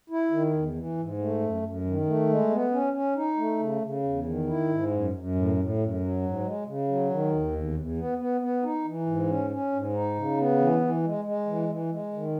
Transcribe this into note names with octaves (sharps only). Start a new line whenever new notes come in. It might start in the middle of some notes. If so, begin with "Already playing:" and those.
E4
D#3
E2
E3
G#2
A3
F#2
F#2
D#3
A3
G#3
B3
C#4
C#4
D#4
A3
C#3
C#3
E2
D#3
E4
G#2
F#2
F#2
A2
A2
F#2
F#3
G#2
G#3
C#3
F#3
D#3
D#2
E2
E2
B3
B3
B3
D#4
E3
G#2
C#4
C#4
G#2
D#4
C#3
B3
E3
E3
G#3
G#3
E3
E3
G#3
D#3